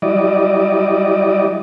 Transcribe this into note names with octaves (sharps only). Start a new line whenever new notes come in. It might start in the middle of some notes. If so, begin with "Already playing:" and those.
F#3 G3 E4 D5 D#5